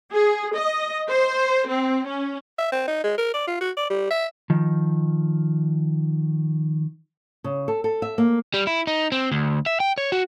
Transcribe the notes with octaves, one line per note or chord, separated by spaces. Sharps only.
G#4
D#5
C5
C4
C#4
E5
C4
D#4
G#3
A#4
D5
F4
F#4
D5
G3
E5
D#3 F3
C#3
A4
A4
E5
A#3
G3
E4
D#4
C4
D2
E5
G5
C#5
F#4